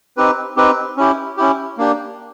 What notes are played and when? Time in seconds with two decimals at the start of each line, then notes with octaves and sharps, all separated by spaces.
0.17 C4 D#4 G4 B4
0.56 C4 D#4 G4 B4
0.97 C#4 E4 G4
1.37 C#4 E4 G4
1.78 A#3 D4 G4